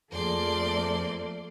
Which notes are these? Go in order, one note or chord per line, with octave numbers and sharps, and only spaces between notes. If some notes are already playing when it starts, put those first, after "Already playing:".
F2 F3 A3 A#3 G#4 A4 D5 C6